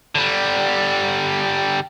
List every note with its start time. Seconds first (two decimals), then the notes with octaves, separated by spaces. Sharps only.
0.15 D3 G3